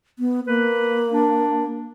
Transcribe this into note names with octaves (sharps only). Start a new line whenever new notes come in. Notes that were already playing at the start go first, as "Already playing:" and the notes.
B3
A#3 B4
D4